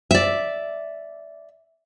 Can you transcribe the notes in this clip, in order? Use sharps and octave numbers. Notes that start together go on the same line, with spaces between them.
D5 E5